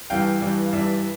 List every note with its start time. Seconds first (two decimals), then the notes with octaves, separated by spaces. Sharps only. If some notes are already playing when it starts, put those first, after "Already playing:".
0.10 G2 E3 G3 F5 G5
0.42 G2 E3 G3
0.66 F5
0.73 G2 E3 G3 D5 E5